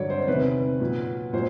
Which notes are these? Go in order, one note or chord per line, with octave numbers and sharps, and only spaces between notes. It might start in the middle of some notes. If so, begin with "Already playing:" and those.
Already playing: G2 D3 F#3 C#5 D5
C5
C5
E2 C3 D#3 B4
A#2 F#3
A#2 F#3 C5